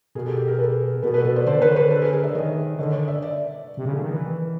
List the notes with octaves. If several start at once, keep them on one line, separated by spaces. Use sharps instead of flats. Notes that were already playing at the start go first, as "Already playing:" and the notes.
B2 G#4 A#4
G4 A4
G4 A4
G#4 A#4
A4 B4
B2 A4 B4
A4 B4
B2 A4 B4
C5 D5
D3 C5 D5
D#3
D3 B4 C#5
B4 C#5
A4 B4
G#4 A#4
G#4 A#4
D5 E5
D#3 C#5 D#5
D3 C#5 D#5
C#5 D#5
D5 E5
D5 E5
C3
C#3
D3
D#3
E3